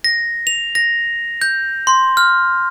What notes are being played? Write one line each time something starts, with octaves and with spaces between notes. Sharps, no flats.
A#6
F7
A#6
G6
C6
F6